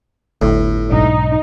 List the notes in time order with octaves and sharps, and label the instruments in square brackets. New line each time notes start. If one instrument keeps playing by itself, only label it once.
[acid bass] G1 [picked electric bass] D2 [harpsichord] A2
[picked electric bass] B1 G#2 D4 [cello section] D#4